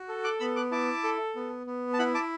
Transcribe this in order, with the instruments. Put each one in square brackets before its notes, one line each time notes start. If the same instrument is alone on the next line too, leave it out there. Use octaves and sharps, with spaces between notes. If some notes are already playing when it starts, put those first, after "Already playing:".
Already playing: [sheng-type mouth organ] F#4
A4
D6 F#6
B3 B5 E6
D6 F#6
E4 A5 D6
A4
B3
B3
A5
E4 F#5 B5
A5 D6